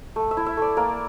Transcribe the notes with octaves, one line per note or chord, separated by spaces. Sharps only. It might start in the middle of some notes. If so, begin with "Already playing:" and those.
A3
E5
E4
E5
A3 D5
A#3 D5